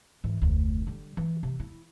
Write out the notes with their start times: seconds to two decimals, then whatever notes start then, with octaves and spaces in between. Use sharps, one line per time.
0.24 G#2 E3
0.42 F1 D2
0.87 D3 G3
1.17 E3
1.43 C3
1.60 E4